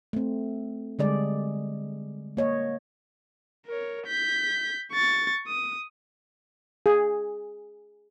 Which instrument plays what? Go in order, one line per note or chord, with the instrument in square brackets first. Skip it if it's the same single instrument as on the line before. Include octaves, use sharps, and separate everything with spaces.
[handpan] A3 C4
D3 G3 G#3 G#4 D5
A#3 C#5 D#5
[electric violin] A#4 C#5
G6 B6
C#6 A6
D#6
[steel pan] G#4